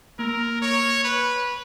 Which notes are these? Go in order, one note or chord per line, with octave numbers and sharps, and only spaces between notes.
A#3 A#4
C#5
B4